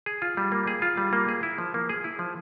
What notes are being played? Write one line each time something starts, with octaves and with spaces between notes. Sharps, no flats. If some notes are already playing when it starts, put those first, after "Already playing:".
G#4
F4
G3
A#3
G#4
F4
G3
A#3
G#4
E4
F3
A#3
G#4
E4
F3